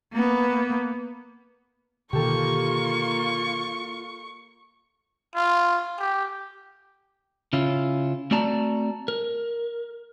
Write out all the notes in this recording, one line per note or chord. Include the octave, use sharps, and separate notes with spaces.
A#3 B3
B2 D3 D#3 A#3 F4 G4 A4 C#6
F4
G4
C#3 C#4 E4 F4
A3 C4 F#4 D5 A5 A#5
A#4